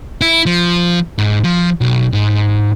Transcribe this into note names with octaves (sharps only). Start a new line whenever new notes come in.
E4
F3
G#2
F3
B1
G#2